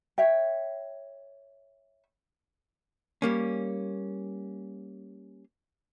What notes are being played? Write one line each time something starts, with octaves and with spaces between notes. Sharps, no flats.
C#5 E5 G5
G3 A#3 C#4